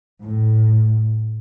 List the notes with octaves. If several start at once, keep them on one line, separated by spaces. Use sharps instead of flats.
A2